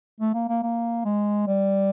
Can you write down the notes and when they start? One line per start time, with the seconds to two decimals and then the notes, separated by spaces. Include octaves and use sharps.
0.20 A3
0.34 A#3
0.49 A#3
0.63 A#3
1.05 G#3
1.47 G3